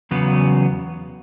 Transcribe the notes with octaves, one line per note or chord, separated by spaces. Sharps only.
E2 C#3 F#3 B3